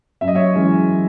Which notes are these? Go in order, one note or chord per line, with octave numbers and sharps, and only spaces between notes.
F#2 E5
D#5
C#5 E5
E3 G#3 C#4